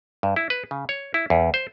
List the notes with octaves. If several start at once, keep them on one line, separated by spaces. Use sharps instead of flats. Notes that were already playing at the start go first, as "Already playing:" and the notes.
G2
E4
B4
C#3
C#5
E4
E2
C5